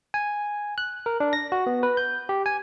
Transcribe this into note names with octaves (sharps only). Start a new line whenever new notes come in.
G#5
F#6
A#4
D4
A#6
F#4
B3
B4
G6
G4
G#5